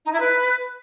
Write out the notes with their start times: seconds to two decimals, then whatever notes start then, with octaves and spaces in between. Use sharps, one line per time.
0.05 D#4
0.13 E4
0.20 B4